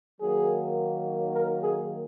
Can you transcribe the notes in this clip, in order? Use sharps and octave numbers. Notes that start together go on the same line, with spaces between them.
D#3 F#3 A#3 G#4
A#4
G#4